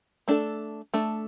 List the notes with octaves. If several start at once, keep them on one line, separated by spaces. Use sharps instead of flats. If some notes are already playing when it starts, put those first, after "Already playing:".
A3 D4 A4
A3 D4 A4